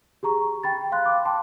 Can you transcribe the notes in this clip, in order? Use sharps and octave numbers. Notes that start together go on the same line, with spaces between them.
G4 G#4 A#5 C#6
G5 B5 A6
F5 C6 F#6
D6
G5 A5 C6